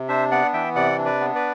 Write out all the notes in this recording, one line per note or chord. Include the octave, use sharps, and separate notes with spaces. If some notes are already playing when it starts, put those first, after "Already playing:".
Already playing: C3
D4 C5 E5
B3 D5 F#5
E3 E5 G5
C3 D5 F#5
D4
B4 D5
B3
B4 D5